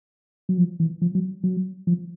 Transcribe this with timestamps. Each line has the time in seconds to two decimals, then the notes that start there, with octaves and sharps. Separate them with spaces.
0.49 F#3
0.58 F3
0.80 E3
1.02 F3
1.15 F#3
1.44 F#3
1.87 F3